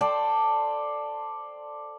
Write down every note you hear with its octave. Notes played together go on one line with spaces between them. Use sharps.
A4 C5 D5 G5